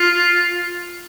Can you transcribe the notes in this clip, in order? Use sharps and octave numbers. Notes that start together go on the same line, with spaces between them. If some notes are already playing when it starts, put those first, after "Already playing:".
Already playing: F4